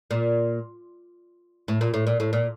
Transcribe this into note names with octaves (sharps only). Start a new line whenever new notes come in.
A#2
A2
A#2
A2
A#2
A2
A#2